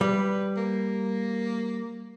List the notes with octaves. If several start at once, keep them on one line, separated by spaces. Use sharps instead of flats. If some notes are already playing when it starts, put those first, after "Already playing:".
G3 B4
A#3